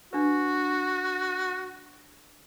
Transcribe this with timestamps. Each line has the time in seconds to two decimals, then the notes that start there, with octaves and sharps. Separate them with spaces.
0.13 D4 F#4 B4